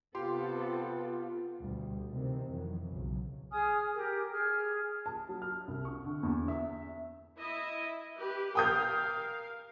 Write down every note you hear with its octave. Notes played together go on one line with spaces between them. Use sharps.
C3 B3 C4 F4 G4 A4 C6
D2 B2 G3
C3 D#3 E3 C4
F2 D#3 E3 F#3
B1 C#3 F#3
G#4 G#5 D#6 F6
G4 A#4
G#4 F6
A5
F#3
F6
C2
C#6
D3
E2
E5
E4 D#5 E5
G4 B4
A#4 F5 G5 D#6 G6